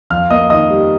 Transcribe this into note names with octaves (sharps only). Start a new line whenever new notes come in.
F2 F5 F6
A#3 D#5 D#6
D#3 D#5 D#6
G3